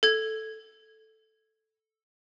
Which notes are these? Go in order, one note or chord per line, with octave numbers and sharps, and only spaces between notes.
A4 G#6